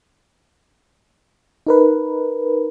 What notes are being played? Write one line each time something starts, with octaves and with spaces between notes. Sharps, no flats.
D#4 A#4 B4